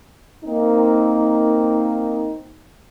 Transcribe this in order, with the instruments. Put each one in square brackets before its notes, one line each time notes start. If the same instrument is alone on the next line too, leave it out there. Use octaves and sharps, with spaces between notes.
[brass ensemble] A#3 C4 D#4